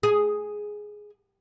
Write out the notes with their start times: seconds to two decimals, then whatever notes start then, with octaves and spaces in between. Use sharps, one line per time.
0.03 G#4